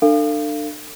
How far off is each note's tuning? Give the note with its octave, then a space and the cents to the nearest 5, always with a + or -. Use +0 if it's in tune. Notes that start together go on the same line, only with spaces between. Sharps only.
D4 +30 A4 +35 F5 -20